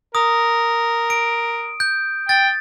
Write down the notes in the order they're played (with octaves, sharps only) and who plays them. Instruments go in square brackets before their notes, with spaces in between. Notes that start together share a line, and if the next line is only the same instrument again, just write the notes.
[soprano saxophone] A#4 [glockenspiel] D#6
[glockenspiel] D7
G6
[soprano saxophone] G5 [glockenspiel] A6